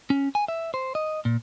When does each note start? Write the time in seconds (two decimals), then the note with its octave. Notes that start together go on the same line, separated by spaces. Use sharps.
0.10 C#4
0.35 G#5
0.48 E5
0.74 C5
0.95 D#5
1.25 A#2